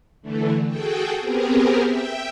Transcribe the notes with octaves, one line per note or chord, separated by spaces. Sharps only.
D3 E3 A3
F#4 G#4 A4 G5
B3 C4 G4 G#4 A#4
E5 G5